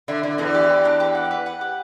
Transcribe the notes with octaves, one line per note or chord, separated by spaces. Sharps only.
D3 E4
D3 E4
E2 E3 E4
G4
G4
D4
G4
F#5
B4
F#5
G4